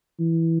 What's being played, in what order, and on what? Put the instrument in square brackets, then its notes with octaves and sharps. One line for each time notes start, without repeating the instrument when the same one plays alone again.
[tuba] E3